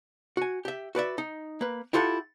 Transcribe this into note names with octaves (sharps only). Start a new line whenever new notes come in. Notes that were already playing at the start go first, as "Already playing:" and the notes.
F#4 G#5
G4 E5
F#4 B4 D5 E5
D#4
A#3 B4
E4 F4 G4 A4 F5 F#5